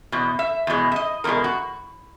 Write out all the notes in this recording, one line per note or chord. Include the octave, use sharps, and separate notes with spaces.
E2 B2
E5
E2 B2 G#3
E5
D#5
E2 B2 G#3 A#4
F#4